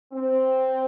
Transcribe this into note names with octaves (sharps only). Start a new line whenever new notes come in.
C4